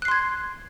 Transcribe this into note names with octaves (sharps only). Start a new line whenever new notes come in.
C6 F#6 G#6 C7